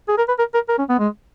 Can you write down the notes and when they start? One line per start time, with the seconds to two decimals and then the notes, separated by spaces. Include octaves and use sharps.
0.08 G#4
0.18 A#4
0.28 B4
0.39 A#4
0.54 A#4
0.69 A#4
0.79 C#4
0.89 B3
0.99 G#3